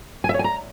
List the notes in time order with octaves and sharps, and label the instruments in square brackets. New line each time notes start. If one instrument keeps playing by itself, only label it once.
[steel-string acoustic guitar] G#5
E5
C#5
G#5
A#5